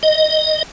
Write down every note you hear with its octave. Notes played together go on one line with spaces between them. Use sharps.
D#5